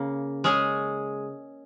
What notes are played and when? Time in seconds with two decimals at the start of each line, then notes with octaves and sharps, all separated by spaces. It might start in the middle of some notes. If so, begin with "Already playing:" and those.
Already playing: C#3 A#3
0.44 G#3 C#4 G#4